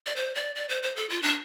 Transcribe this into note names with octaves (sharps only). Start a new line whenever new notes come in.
D5
C5
D5
D5
C5
C5
A4
F4
D4